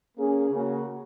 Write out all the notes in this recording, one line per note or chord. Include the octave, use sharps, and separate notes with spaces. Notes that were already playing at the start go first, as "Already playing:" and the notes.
A#3 C#4 G#4
C#3 A#3 F#4